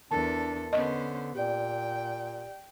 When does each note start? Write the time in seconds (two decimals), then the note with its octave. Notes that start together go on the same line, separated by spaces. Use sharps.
0.11 E2 D4 A4 A#4 A5
0.73 D3 B3 C#4 C5 D#5
1.35 A#2 G4 D5 G5